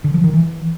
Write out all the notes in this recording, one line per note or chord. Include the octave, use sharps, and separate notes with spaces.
D3
F3
D#3
E3